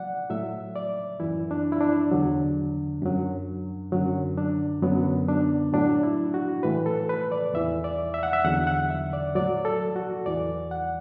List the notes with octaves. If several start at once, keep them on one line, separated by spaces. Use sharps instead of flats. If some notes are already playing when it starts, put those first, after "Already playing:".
Already playing: F#3 D5 F#5
A2 F#3 E5
D5
F#2 E3 E4
D4
E4
D4
E2 D3 F#3
F#2 F#3
F#2 D3 F#3
D4
F#2 D3 F#3 B3
D4
A2 F#3 D4
E4
F#4
A2 E3 B4
A4
B4
D5
E2 E3 E5
D5
E5
F#5
E5
E2 D3 F#3 F#5
F#5
E5
D5
A2 F#3 D5
A4
F#4
E2 E3 D5
F#5